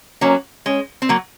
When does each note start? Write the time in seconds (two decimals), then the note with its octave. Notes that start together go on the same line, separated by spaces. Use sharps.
0.21 F#3 A#3 C#4
0.66 G#3 C#4
1.02 C4
1.09 F#3 A#3